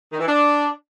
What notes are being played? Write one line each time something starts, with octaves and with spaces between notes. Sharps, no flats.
D#3
E3
D4